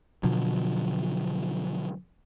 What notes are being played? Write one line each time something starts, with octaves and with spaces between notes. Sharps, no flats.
B2 D3 F3 F#3